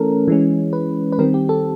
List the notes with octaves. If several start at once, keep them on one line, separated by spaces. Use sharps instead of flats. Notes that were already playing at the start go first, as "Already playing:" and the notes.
Already playing: E3 A3 C#4 A4 A#4
E3 G#3 C#4
B4
B4
D#3 G3 C4 A#4
G4
A4